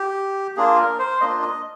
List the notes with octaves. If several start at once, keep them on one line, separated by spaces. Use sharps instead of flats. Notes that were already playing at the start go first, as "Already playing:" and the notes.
Already playing: G4
A#3 D4 F4 G#4
A#4
C5
A#3 D4 F4 D#5
D#5